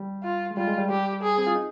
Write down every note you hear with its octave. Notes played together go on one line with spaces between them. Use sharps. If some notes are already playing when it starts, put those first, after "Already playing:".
Already playing: G3
F4
G#3
G3 F4
G#3
G3
G3 G4
G#4
C4
F4
D#4